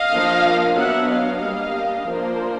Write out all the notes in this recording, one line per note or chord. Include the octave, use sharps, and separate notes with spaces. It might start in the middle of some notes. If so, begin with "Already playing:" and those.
Already playing: D#5 F5
F3 A#3 D4
F#3 B3 D4 E5 F#5
D#5 F5
G3 A#3 D4
F3 A#3 D4 A#4 C5